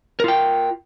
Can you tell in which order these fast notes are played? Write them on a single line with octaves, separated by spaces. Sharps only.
A#4 F4 G5